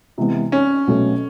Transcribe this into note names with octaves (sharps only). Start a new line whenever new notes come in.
C3 E3 G#3 B3
C#4
B2 F#3 A3 C#4